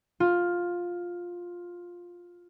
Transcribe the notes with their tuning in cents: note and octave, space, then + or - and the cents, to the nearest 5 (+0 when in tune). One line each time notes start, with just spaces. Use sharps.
F4 +10